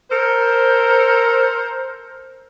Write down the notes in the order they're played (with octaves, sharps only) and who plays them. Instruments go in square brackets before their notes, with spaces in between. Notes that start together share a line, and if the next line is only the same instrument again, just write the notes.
[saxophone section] A4 A#4 C5